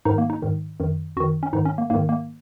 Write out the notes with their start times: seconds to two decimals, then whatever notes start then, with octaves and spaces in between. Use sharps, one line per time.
0.05 G#2 D#3 D#4
0.18 A#3
0.30 D#4
0.42 G#2 D#3
0.80 F#2 D#3
1.17 F#2 D#3 F#4
1.43 C#4
1.53 G#2 D#3 D#4
1.65 C#4
1.78 A#3
1.90 G#2 D#3 A#3
2.09 A#3